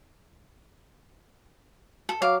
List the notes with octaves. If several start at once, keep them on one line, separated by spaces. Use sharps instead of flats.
A4
F#3 F5 D6